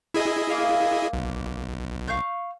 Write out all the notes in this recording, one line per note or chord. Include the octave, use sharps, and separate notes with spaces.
E4 G#4 D#5
A#3 F5
B1
F5 C#6 G6